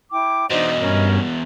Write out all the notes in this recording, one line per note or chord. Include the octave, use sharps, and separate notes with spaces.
E4 G5 D6
E2 B2 D4 D#4 C5 D#5
G2 C#4 A#4